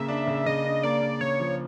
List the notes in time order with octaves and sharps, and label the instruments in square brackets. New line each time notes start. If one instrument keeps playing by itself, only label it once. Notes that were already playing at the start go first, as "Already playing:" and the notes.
Already playing: [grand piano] C#3 A#3 [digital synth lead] E5
[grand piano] D4
C#3
[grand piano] C#3 [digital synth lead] D#5
[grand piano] D4
[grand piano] A#3 [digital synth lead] D5
[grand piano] A#3
[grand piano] C#3 [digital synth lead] C#5
[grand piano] F3